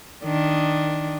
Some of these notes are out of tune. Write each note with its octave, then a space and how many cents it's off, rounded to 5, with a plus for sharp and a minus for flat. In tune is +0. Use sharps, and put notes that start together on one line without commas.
D#3 +5 D4 +5